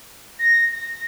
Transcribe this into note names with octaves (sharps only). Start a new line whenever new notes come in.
A#6
A#6